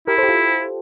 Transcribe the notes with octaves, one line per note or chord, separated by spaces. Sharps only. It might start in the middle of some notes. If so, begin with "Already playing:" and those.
E4 G4 A#4
A4 C5
G4
F4 A4